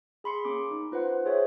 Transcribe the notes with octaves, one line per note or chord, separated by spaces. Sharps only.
G#4 B5 C6 C#7
A#3 C#4 D6
D#4
F4 B4 C5 F#5
G#4 C5 C#5 E5